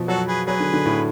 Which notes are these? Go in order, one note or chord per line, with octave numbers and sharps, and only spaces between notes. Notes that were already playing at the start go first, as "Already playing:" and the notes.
Already playing: B2 F3
F#3 F#4 A4
G#4 B4
F#3 G#4 B4
D3
D3
A2